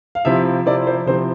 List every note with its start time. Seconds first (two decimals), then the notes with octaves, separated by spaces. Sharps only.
0.15 F5
0.25 C3 F3 C4 E4 E5
0.66 C3 F3 C4 E4 D5
0.87 C5
1.06 C3 F3 C4 E4 C5